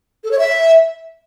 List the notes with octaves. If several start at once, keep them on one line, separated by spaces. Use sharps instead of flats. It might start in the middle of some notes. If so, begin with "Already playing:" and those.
A4
C#5
E5